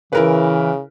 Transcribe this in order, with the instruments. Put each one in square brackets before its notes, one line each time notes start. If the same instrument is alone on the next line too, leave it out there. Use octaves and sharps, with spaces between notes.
[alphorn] C#3 [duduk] E3 [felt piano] E4 A#4 B4